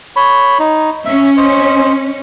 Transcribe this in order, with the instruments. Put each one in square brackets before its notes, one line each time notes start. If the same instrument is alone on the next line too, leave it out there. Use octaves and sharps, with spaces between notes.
[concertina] C#5 B5
D#4
[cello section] C#4 [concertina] E5
[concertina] C5 D#5